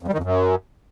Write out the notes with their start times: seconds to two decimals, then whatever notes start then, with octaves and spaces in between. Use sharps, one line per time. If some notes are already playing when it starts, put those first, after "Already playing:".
0.03 F2
0.08 G3
0.13 D#3
0.18 F2
0.23 F#2